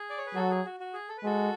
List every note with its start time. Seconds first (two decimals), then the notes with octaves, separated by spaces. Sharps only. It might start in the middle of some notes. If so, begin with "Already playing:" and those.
Already playing: G#4
0.10 D5
0.18 C#5
0.27 B4
0.35 F#3 F#4 A4
0.50 G#4
0.65 F#4
0.80 F#4
0.93 G#4
1.09 A4
1.17 B4
1.24 G#3 F#4 A4